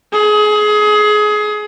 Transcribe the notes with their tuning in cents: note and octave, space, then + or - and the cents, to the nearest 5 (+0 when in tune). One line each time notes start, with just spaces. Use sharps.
G#4 +25